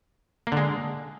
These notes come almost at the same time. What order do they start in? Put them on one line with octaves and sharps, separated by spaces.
A#3 D3 G#3